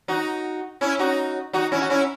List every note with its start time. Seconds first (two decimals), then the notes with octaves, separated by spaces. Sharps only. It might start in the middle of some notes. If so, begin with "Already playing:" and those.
0.08 D#4 F#4
0.81 C#4 E4
0.99 D#4 F#4
1.53 D#4 F#4
1.72 C#4 E4
1.81 F#4
1.90 C#4 E4